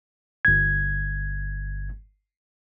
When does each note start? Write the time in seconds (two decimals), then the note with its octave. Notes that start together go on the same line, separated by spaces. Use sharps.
0.45 G1 G#6